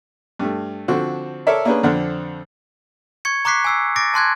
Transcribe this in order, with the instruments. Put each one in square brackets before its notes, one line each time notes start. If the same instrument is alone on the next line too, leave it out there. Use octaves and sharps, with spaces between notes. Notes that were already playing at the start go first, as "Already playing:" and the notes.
[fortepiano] G2 A3
D3 F3 C4 F#4
A4 A#4 C#5 D5 E5
A#3 C#4 D4 G#4 B4
F2 D3 C4 D4 F#5 F6
[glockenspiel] C#6 G#6 C#7
A#5 C#6 D6 F#6 B6 C7
G#5 E6 C7
D6 A6 A#6 D7
A5 C6 F#6 G#6